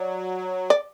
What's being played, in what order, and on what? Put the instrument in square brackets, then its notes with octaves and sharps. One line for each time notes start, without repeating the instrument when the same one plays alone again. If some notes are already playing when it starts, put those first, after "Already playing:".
Already playing: [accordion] F#3 [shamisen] D5
[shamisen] D5